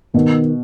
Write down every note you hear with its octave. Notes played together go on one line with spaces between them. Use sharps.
B2 D#3